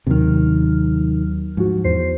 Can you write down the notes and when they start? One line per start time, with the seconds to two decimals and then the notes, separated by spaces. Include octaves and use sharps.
0.07 D#2 C3 D#3 F#3 F6
1.57 G#2 F3 F#4
1.84 E2 C5 C7